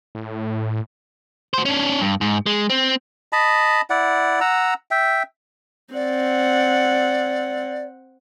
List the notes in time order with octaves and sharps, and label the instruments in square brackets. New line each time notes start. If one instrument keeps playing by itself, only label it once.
[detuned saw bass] A2
[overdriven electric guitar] F#4 C5
C#4 D4
G2
G#2
G#3
C4
[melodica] D#5 A5 B5
E4 D5 F#5
F#5 A#5 E6
E5 G5
[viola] C4 F#5 [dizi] D5